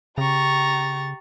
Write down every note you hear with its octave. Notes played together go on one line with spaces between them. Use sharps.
C#3 G4 A#5 C#6 A6